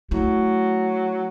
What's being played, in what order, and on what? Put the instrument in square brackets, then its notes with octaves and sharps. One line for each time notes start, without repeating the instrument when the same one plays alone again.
[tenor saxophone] F#3 [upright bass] A3 E4